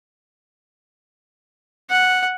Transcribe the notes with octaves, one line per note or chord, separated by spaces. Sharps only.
F#5